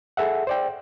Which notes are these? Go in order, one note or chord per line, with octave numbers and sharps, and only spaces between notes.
G#4 A4 E5 F#5
C5 D5 G5